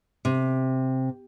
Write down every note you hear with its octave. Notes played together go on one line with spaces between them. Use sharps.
C3